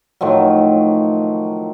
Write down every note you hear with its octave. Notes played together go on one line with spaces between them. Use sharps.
A2 D#3 F3 F#3